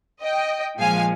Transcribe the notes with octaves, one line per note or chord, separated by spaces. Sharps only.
D#5 G5
A#2 F3 G#3 F5 G#5